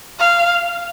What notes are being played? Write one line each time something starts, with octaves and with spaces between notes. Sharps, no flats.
F5